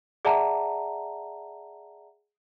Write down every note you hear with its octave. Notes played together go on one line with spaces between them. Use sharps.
G#4 D5 E5 F#5 A5 A#5